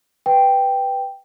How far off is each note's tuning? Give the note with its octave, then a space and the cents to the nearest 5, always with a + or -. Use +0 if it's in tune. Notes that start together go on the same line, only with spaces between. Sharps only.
B4 +0 G5 +0